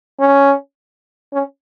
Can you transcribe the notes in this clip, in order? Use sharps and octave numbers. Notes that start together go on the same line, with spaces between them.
C#4
C#4